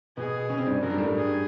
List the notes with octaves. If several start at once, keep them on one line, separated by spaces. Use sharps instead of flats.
B2 B3 G#4
C#3 C#4
C3 C4
G2 G3
F#2 F#3 A#4
G2 G3
A2 A3
G2 G3
G#4